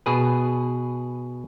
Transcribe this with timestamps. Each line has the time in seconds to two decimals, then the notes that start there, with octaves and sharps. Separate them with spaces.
0.06 B2 G#4 B4